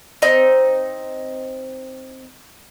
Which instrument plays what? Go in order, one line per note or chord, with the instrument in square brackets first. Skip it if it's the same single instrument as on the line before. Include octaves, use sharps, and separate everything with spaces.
[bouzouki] C4 D#4 D#5